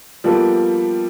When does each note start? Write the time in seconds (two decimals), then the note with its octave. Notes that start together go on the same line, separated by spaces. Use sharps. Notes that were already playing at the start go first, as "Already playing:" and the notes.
0.24 F3 G3 A#3 B3 A4